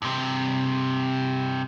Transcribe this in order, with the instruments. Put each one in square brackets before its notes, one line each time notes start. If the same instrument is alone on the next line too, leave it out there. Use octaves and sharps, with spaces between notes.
[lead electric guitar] G2 C3